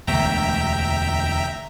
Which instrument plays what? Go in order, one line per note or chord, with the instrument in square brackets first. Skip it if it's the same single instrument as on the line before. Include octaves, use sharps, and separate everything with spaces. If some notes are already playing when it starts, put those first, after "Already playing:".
[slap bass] E1 D2 D3 [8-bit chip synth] E5 G5 A#5